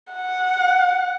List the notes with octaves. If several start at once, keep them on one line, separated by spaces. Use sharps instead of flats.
F#5